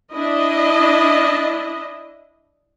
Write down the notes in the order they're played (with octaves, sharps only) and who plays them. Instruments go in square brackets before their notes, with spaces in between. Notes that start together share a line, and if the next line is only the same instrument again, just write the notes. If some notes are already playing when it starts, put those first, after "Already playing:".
[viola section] D4 E4 D#5